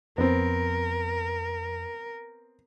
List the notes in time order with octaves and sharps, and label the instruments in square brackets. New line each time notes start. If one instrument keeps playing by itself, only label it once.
[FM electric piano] F2 [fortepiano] B3 C4 [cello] A#4